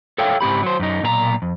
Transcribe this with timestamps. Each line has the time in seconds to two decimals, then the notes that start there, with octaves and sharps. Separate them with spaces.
0.18 A4 C#5 E5 F5 G5
0.41 C#2 G#2 C4 G4 B5
0.63 F#3 C5
0.80 F#2 D#4
1.02 B1 A#2 B4 A#5
1.42 F2